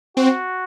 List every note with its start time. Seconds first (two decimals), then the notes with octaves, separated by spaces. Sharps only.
0.16 C4 F#4